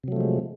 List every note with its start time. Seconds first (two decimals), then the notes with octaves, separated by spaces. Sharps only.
0.04 C3
0.08 F#3
0.12 A3
0.16 F3
0.21 G#3